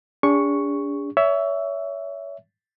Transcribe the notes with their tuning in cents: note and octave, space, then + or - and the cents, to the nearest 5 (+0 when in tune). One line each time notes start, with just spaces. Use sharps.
D4 -35 G#4 -40 C#6 +0
C#5 +30 E5 +0